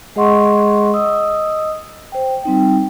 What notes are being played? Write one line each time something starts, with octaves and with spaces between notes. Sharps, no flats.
G#3 G#4 D#5 F#5 C6 C#6
D#5 D#6 E6
C5 G5
G3 C4 D#4 G5